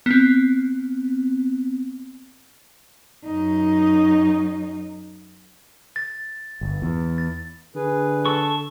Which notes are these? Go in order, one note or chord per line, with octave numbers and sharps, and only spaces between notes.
B3 C4
F#2 D#4
A6
G1
E2
A6
D3 G#4 B4
A4 C#6